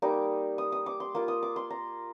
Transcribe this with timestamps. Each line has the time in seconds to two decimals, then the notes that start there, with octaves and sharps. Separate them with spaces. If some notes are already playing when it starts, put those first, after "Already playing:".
0.02 G3 A#3 D#4 D6
0.58 D#6
0.72 D#6
0.86 D6
1.00 C6
1.15 A#3 F4 D6
1.28 D#6
1.43 D6
1.56 C6
1.70 A#5